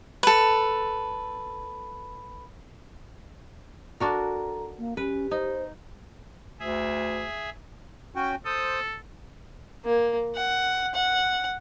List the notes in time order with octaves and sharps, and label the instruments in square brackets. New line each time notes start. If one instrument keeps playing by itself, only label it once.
[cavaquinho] A4 B4
[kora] D4 F#4 A#4 [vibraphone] A4 A#5
[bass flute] A#3
[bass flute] C#4 [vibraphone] G4 [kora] B4
[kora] D#4 [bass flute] C5
[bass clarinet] D2 [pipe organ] G#4 E5
[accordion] C#4 F#4 G5
[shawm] A4 [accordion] C5 D#6
[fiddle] A#3
F#5
F#5